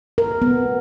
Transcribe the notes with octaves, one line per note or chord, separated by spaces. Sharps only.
A#4
B3